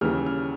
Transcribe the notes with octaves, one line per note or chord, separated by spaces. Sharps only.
D#2 C#3 E3 G3 F6
F6